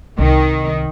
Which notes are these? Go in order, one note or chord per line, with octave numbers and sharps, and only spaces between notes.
C2 D#3